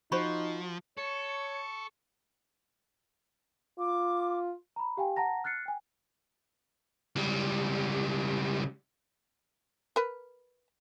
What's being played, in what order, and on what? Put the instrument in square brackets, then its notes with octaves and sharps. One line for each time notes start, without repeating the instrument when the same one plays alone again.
[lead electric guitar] F3 [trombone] D#4 [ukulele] F#4 C5 [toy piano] B5 C#6
[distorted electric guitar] A4 [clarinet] C#5 [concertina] C#6
[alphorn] F4 [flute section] D6
[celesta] A#5 B5
G4 F5 G5 G#5
F#5 A5 A#5 A#6
F6 F#6 A6 C7 C#7
G5 G#5
[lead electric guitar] C#2 G3
[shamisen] A#4 B4